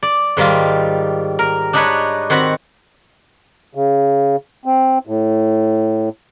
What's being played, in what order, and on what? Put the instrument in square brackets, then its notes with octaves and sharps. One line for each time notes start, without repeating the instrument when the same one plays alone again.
[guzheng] D5
G#2 D#3 G3 F4
A#4
D4 D#4 B4 C#5
D#3 C4 F#4 F#5 B5
[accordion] C#3
C4
A2